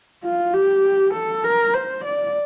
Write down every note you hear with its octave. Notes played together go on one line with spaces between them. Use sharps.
F4
G4
A4
A#4
C5
D5